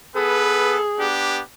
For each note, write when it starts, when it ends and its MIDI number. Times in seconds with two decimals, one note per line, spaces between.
0.16 0.78 59
0.16 1.07 68
0.16 0.78 69
0.16 0.78 71
1.00 1.41 59
1.00 1.41 62
1.00 1.41 67